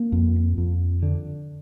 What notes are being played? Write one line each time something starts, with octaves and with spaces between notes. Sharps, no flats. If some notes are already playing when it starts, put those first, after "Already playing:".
Already playing: A#3
F2
F2
D3